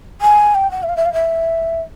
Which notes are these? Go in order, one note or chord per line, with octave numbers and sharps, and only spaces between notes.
G#5
G5
F#5
E5
F5
E5
F5
E5